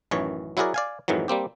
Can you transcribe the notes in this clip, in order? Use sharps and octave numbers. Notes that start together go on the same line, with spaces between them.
A1 F#2 D#3 E3 C#5
F#3 E4 F#4 G#4 A#4 D5
D5 F5 G#5
F2 G#2 D#3 E3 F#3
G3 A#3 C4 G4